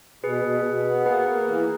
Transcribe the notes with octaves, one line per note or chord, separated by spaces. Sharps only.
B2 G#4 B4
B2
B2
B3
A#3 G#4 B4
A#3
E3